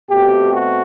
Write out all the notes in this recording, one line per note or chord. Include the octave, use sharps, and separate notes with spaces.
B2 A3 C4 G4
F#4